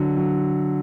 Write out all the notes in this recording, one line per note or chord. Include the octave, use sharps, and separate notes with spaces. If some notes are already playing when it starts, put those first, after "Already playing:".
Already playing: D3 F#3
F#3